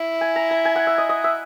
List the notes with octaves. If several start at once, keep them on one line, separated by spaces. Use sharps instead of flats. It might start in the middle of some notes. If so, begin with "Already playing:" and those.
Already playing: E4
G#5
A#5
A#5
G#5
F#5
E5
D#5
D#5
E5